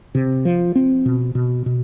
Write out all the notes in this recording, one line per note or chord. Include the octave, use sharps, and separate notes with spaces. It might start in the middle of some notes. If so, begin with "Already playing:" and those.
C3
F3
C4
B2
B2
B2